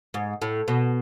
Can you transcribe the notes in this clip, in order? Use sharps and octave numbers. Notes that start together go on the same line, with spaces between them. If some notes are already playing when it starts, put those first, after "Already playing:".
G#2
A2
B2